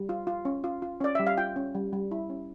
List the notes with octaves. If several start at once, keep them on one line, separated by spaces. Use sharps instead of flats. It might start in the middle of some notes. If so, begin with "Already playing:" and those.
Already playing: G3
F4
F4
C#4
F4
F4
C#4 D5
G3 E5
F5
F4 G5
C#4
G3
G3
E4
C#4